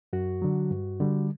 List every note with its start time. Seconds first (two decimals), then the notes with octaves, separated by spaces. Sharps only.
0.13 F#2 F#4
0.42 D3 F#3
0.71 G2
1.00 D3 G3